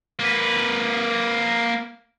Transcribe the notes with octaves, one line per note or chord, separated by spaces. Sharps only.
A#3 B4